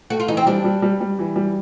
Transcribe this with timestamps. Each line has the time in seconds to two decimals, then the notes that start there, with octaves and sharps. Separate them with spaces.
0.10 A3 F#4
0.20 F4
0.28 E3 D#4
0.37 C4
0.46 G3 D4
0.65 G3
0.82 G3
1.00 G3
1.19 E3
1.36 G3